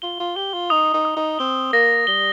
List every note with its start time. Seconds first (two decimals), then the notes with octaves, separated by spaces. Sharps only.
0.02 F4 G7
0.20 F4
0.36 G4 G7
0.53 F4
0.70 D#4 D#6
0.94 D#4
1.05 D#6
1.17 D#4
1.39 C4 G7
1.73 A#3 A#6
2.07 G3 G7